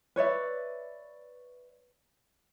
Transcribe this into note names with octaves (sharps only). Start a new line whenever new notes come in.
B4 C#5 D5 E5